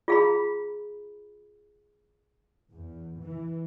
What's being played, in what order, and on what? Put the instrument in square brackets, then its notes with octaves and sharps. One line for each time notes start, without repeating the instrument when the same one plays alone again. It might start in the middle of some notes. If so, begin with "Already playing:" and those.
[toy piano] F4 G#4 F5 A#5 B5
[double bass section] E2
E3